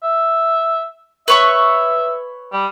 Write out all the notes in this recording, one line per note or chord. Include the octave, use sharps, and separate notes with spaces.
E5
B4 C#5 E5 C#6
G3